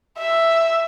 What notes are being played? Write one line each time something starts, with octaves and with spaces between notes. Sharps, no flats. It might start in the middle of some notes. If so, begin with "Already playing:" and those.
E5